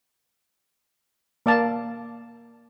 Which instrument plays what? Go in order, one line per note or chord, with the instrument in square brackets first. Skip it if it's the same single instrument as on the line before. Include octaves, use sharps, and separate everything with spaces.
[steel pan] A#3 D5 F5 A5